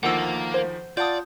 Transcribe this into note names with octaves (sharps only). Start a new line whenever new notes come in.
D2 D#3 F3 A#3 F#5 E6
C5
F4 D5 F#5 A5 D#6 G6